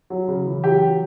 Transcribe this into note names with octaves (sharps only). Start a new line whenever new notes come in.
F#3
C#3
E3
F#3 G4
F#3